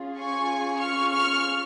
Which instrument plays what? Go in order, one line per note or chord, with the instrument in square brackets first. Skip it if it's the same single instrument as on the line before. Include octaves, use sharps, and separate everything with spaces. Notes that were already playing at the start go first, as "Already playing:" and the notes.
Already playing: [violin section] C#4 F4 G#4
G#5 C#6
C#6 F6
C#6 F6